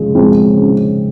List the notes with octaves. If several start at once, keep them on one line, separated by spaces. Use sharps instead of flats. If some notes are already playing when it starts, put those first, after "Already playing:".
Already playing: C#3 F3 G#3
F3 G#3 C4
C#3